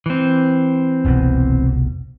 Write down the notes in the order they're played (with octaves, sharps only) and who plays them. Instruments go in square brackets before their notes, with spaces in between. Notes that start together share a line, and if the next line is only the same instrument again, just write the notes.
[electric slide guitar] E3 C4
[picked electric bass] F1 C2 B2